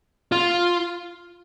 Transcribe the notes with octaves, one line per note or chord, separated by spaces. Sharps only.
F4